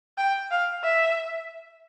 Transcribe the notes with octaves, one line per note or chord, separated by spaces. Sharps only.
G5
F5
E5